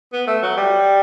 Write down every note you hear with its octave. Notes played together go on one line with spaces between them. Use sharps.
B3
A3
F#3
G3